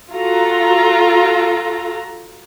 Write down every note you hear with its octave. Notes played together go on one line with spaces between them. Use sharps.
F4 F#4 A4 A#5